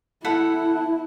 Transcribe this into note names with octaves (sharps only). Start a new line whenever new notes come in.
E4 A4 F#5 B5